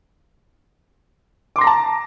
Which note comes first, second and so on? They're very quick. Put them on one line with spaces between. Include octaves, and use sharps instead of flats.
D6 C6 A#6 A#5 A5